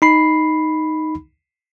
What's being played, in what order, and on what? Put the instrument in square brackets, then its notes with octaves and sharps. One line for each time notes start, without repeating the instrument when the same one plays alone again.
[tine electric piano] D#4 B5 C7